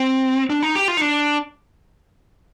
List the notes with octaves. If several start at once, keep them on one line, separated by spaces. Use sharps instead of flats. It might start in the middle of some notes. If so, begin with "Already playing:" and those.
Already playing: C4
D4
D#4
G4
F4
D#4
D4